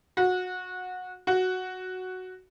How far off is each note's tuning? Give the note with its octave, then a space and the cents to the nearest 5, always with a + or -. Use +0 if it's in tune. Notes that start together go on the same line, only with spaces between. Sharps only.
F#4 -20
F#4 +0